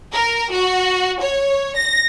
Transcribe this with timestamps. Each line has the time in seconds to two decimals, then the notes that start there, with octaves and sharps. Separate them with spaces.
0.13 A#4
0.52 F#4
1.21 C#5
1.77 A#6